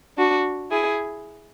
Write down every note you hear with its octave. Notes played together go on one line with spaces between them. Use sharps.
D4 F#4
E4 G#4